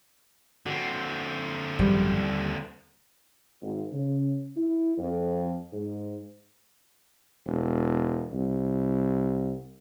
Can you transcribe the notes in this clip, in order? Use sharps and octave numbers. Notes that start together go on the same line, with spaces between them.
D3 C4 F#4
G#1 F#2 F3 G3
D#2
G#1
C#3
E4
F2
G#2
E1
C2